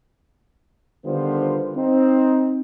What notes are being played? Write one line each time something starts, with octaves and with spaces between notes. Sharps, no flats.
D3 D#3 G3 B3 F4 C5
C4 D#4